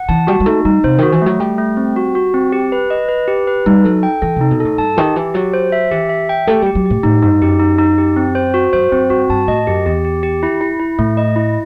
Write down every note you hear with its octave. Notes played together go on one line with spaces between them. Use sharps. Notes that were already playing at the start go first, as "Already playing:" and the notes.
Already playing: F#5
E3 A5
G3 F#4
G3
A3 D#4
G3 D#4
C3 C5
D#3 F#4
E3
F#3 A3
G3 A3
A3
C4
F#4
F#4
C4
G4
B4
D#5
B4
G4
B4
G3 D#4
F#3 A4
G5
E3 A4
C3 D#4
B2
A2 A4
G2 A5
D#3 G4
E3 G4
F#3 G4
C5
E5
E3 G4
E5
G5
A3 G4
G3 G4
F#3
A2 G4
A2 D#4
G2 D#4
F#2 G4
D#4
D#4
G4
C4
C5
F#4
F#2 C5
F#2 C4
G2 F#4
G2 A5
A2 D#5
F#2 G4
E2 G4
G4
G4
E4
E4
E4
A2 A3
D#5
E4